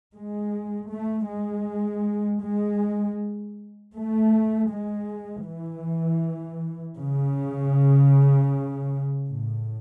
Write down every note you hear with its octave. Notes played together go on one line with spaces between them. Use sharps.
G#3
A3
G#3
G#3
A3
G#3
E3
C#3
A2